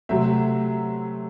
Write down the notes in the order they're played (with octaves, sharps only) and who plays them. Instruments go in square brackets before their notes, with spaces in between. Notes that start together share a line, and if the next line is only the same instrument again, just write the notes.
[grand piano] C3 F#3 A3 C4 E5